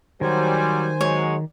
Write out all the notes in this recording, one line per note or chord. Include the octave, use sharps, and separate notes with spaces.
D#3 F#3 G3 C5 G#5
F#3 G#3 C#5